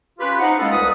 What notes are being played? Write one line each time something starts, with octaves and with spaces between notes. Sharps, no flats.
C#4 F4 G4 B4
D#4 C5 F#5
G#3 A#3 C#4 E4 F4 A4
C2 B4 D#6